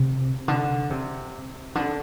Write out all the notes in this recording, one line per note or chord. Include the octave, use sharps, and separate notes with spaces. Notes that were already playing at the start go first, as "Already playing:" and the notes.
Already playing: C3
D3
C3
D3